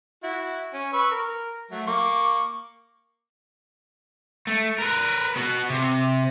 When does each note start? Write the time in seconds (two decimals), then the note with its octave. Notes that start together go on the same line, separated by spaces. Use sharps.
0.23 E4 F#4
0.74 C#4
0.93 B4 C#6 E6
1.11 A#4
1.71 F#3 A3
1.87 A#3 C#6 D6
4.47 A3
4.79 A#4 B4
5.36 B3 F#4
5.70 C3